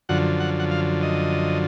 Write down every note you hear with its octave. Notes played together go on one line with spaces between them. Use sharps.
F#2 D3 F3 F#5
F#5
F#5
F5
D#5